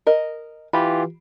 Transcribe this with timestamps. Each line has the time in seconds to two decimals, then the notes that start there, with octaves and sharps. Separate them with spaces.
0.07 A#4 D#5
0.73 E3 F4 G4 B5